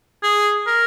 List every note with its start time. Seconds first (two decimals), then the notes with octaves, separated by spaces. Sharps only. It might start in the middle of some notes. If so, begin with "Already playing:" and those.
0.23 G#4
0.67 A#4